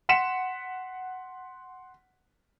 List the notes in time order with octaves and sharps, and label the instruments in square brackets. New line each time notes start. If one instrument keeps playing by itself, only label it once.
[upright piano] F#5 C6 B6 C#7 E7